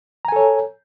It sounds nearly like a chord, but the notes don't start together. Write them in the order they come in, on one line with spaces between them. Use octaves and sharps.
A#5 G#5 A4 C#5